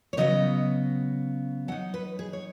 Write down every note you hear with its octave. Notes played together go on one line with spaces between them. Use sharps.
C#5
C#3 F#3 B3 D#5
F#3 D#4 F#5
B4
G#4
C#5